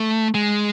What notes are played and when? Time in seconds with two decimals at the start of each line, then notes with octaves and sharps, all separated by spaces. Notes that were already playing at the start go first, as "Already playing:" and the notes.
Already playing: A3
0.34 G#3